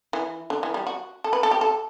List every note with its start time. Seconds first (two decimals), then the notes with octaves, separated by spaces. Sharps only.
0.13 E3
0.50 D3
0.63 E3
0.74 G3
0.87 F#4
1.24 A4
1.33 B4
1.43 A4
1.51 G4
1.61 A4